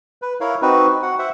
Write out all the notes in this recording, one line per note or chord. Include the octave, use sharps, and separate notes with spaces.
B4
E4 A#4 C#5 F5
C4 D#4 F#4 B4
F#4 F#5
C5 E5 F#5